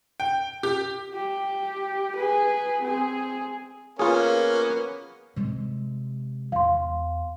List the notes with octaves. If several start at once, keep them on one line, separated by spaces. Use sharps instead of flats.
G5
G4
G4
G#4 B4
C4 G#4
A#3 B3 C#4 F4 G#4
C3 G#3
E2 F5 C6